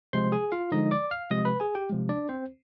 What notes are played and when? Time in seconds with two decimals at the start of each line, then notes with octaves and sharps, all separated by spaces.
0.13 C3 F3 G#3 C5 C6
0.32 G#4 G#5
0.52 F4 F5
0.72 D3 F3 G#3 D#4 D#5
0.91 D5 D6
1.11 F5 F6
1.31 C3 F3 G#3 D#5 D#6
1.45 B4 B5
1.60 G#4 G#5
1.75 G4 G5
1.90 C3 F3 G#3
2.09 D4 D5
2.29 C4 C5